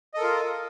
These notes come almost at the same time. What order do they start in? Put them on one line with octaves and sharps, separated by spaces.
D#5 A4 A#4 F4